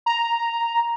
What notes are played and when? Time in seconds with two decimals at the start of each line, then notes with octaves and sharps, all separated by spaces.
0.06 A#5